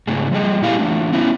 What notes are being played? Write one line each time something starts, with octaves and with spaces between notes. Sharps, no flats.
G#2 C#3 A3 G#4
F3 G3 G#4 D#5
A#2 A3 E4 G4 F5 G#5
E3 A3 D4
B3 C#4 E4 E5